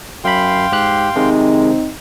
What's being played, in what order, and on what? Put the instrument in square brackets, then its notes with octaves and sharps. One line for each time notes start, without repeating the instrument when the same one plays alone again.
[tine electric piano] F#2 B5 [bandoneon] F5 G5 C6
[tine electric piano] G#2 G4 F#6
[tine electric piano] C3 D#3 G#3 [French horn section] C4 D#4